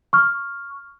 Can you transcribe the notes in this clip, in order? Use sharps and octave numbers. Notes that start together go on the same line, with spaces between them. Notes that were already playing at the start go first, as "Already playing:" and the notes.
C#6 F6